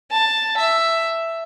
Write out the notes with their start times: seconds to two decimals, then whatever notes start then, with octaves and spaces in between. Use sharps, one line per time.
0.11 A5
0.57 E5